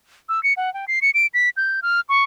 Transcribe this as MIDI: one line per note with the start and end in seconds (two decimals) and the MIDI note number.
0.29 0.42 88
0.43 0.53 97
0.57 0.72 78
0.74 0.86 79
0.88 1.00 96
1.02 1.11 97
1.14 1.27 98
1.34 1.49 95
1.57 1.80 91
1.82 2.01 89
2.09 2.24 85